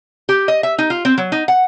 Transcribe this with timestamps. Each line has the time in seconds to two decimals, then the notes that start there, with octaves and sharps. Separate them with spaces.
0.29 G4
0.48 D#5
0.63 E5
0.78 D#4
0.90 F4
1.05 C4
1.18 F#3
1.32 D#4
1.48 F#5